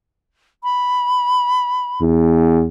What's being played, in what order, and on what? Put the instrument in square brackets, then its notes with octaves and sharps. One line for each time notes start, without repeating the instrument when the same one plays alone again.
[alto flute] B5
[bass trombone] E2